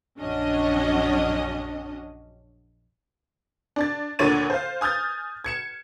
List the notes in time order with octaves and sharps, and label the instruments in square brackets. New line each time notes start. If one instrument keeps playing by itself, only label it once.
[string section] A#1 F#2 C#4 D4 F#4 D#5
[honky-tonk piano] D4 D5 A6
D2 A#2 D3 C#5 A6 D#7
C5 F5
G#5 D#6 F6 G6 A6
G#6 C#7 E7